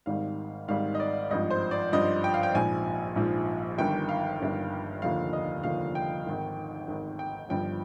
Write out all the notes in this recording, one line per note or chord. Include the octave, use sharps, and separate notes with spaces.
G#1 G#2 D#3 G3 F5
G#1 G#2 D#3 G3 F5
D#5
D5
G#1 G2 F3 D#5
C5
D5
G#1 G2 F3 D#5
G5
F5
G5
A#1 G#2 F3 G#5
A#1 G#2 F3
G1 G2 D#3 G5
F5
G1 G2 D#3
F1 D#2 D3 F3 F5
D#5
F1 D#2 D3 F3 F5
G5
G#1 G#2 D#3
G#1 G#2 D#3
G5
G1 G2 F3 G5